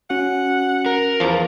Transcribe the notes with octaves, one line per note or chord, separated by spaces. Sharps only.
C#4 F#4 F#5
A#4
E2 F3